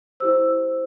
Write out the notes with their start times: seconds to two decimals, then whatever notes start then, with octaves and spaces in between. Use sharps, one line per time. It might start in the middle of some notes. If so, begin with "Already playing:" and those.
0.20 E4 G4 C5 E6